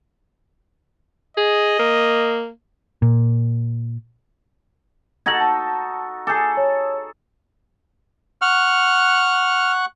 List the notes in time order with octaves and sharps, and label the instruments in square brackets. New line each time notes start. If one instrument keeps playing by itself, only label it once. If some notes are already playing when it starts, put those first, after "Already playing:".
[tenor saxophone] G#4 [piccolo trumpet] D#5
[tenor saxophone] A#3
[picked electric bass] A#2
[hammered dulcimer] D#4 F#4 A4 [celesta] G#6 F#7
[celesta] A5
[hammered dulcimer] G#4 A4 [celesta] D6 G6 C7
[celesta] C#5
[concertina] F#5 C#6 F#6 [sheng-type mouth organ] F6